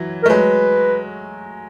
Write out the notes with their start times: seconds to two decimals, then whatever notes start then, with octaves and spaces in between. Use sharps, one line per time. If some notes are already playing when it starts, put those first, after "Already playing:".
Already playing: E3 F#3
0.23 A#4
0.26 A3
0.29 F#3 G#3 B4